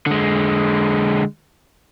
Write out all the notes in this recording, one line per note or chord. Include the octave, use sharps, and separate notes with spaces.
D3 G#3